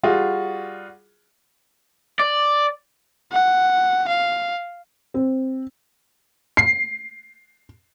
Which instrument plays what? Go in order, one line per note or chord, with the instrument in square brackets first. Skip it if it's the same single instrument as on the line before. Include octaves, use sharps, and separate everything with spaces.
[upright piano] G3 F4 F#4 G#4
[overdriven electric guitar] D5
[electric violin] F#5
F5
[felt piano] C4
[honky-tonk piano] C7